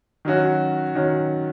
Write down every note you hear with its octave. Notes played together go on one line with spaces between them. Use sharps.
D#3 F#3 C#4 F#4
D#3 F#3 C#4 F#4